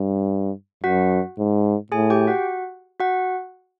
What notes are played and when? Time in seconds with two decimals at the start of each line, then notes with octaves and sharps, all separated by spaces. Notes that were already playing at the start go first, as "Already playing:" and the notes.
Already playing: G2
0.84 F#2 F#4 F#5
1.38 G#2
1.92 A2 G#4 G#5
2.10 G4 G5
2.27 F#4 F#5
3.00 F#4 F#5